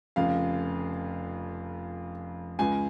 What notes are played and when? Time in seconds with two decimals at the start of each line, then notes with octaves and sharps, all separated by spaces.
0.16 F1 F2 C#3 F5
2.59 C#2 C#3 G#5